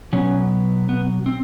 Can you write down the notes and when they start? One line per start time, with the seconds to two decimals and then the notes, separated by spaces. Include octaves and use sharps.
0.13 B2 F#3 B3 C#4
0.89 B3
1.26 C4